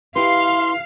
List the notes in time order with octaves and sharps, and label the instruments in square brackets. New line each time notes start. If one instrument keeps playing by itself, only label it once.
[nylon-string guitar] E4 G4 B4 [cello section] F5 [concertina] C6